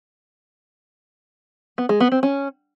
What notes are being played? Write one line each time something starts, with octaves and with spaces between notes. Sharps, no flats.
B3
G#3
B3
C4
C#4